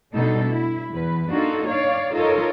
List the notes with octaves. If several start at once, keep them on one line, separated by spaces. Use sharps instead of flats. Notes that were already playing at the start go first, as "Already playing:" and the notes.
B2 G3 A3 D4 D#4 A4
E4
E2 B4
A#3 D4 D#4 F4 F#4 A4
C#5 D5 F5
D#4 F4 A4 A#4 C#5 D#5